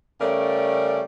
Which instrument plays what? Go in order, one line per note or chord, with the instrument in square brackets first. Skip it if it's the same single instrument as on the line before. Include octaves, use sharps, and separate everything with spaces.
[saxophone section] C#3 G3 A3 C#4 A#4 D5